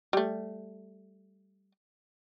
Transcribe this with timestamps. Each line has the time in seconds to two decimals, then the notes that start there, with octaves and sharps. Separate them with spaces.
0.13 G3 A3